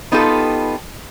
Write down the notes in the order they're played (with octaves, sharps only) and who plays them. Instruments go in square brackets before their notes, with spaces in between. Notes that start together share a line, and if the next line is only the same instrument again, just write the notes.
[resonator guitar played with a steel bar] B3 D#4 F4 G4 A4